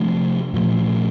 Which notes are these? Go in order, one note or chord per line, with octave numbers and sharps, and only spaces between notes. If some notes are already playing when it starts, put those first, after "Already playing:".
Already playing: C3 F3 A3 D4
A#2 F3 A3